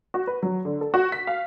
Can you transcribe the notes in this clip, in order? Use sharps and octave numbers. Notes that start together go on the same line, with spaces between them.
F#4
B4
F#3
D3
A4
F#4
B6
F5